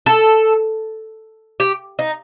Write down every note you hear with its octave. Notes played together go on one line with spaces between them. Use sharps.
A4
G4
D#4